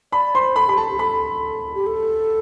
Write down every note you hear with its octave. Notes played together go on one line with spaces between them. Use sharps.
D5 B5
C5 C6
A4 B5
G4 B5
A4 A5
G4
A4 B5
G4
A4